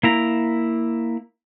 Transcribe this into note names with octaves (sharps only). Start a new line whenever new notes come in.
A#3 E4 A#5